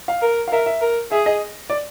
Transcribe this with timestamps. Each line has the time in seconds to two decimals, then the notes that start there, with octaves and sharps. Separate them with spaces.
0.08 F5
0.22 A#4
0.48 F5
0.52 A#4 E5
0.66 E5
0.81 A#4
1.11 G#4 E5
1.26 D#5
1.70 D5